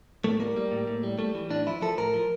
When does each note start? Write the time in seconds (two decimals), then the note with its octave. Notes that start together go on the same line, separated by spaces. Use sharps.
0.24 A2 A3
0.40 G3 A#3
0.56 G3
0.72 A2
0.87 A2
1.03 G3
1.19 G3 A3
1.35 E3
1.50 A2 D4
1.67 F3 E4
1.82 F3 A4
1.98 A2 A#4
2.14 F3